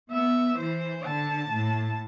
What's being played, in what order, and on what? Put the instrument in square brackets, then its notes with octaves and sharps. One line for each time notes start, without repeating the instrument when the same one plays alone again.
[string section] B3 [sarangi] E5
[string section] E3 [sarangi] C5
[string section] D3 [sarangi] A5
[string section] A2